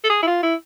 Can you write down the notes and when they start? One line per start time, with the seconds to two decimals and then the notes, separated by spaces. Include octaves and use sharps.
0.04 A4
0.10 G#4
0.22 E4
0.27 F4
0.43 E4